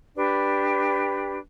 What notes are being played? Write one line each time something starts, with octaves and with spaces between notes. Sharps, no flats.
D4 G4 B4